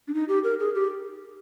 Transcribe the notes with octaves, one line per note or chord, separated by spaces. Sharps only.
D4
D#4
G4
A#4
G#4
G4